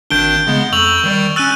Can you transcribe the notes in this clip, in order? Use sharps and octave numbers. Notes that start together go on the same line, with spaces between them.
G#1 D#3 D4 G6 D7 G7
C#3 G#3 B3
F2 C#6 E6 F7 F#7
D#3 G3 D5
C#4 E6 F#6 A6 D#7